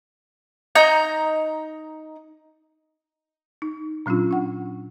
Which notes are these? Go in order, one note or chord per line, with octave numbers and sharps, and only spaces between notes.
D#4 A#5 G6
D#4
A#2 F#3 C#4 D4 F4
D4 F#5